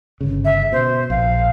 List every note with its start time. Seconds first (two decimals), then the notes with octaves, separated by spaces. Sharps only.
0.21 G1 C#3
0.44 E5
0.72 B2 C5
1.10 A#1 F5